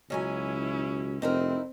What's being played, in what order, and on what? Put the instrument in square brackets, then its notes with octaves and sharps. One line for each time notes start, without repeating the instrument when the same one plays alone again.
[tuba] C#2 [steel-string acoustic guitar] B2 F#3 G#5 [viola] C#4 E4
[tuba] F1 [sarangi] C4 [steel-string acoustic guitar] D#4 E4 A#4